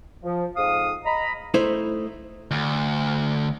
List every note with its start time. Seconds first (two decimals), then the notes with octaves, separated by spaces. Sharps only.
0.23 F3
0.56 F2 G#2 F5 D#6
1.05 D#5 A#5 B5
1.54 A3 D#4 E4 C5
2.51 D2